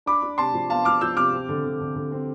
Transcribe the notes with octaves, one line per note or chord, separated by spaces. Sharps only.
D4 B5 D6
D4
C3 A5 C6
F3
B3 F5 A5
F3 D6 F6
F3 E6 G6
C3 D6 F6
C4
D3
D3
D3
D3
C4